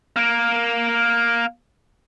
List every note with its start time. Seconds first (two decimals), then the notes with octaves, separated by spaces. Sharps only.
0.16 A#3 A#4